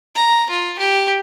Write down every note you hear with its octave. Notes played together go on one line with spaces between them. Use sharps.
A#5
F4
G4